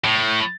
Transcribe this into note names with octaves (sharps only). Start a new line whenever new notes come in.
A2